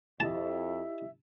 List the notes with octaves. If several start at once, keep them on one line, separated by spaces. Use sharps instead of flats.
F2 E4 G4 D#5 E5 A5